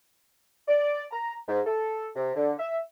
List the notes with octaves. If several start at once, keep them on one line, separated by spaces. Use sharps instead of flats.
D5
A#5
G#2
A4
C3
D3
E5